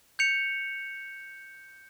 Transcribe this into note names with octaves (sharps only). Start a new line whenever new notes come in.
G6 C#7 F7